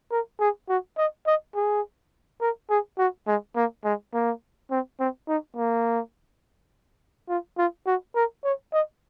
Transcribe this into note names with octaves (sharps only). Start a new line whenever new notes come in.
A#4
G#4
F#4
D#5
D#5
G#4
A#4
G#4
F#4
G#3
A#3
G#3
A#3
C4
C4
D#4
A#3
F4
F4
F#4
A#4
C#5
D#5